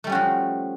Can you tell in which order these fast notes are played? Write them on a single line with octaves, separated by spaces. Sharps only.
A3 G3 C#4 F#4 F3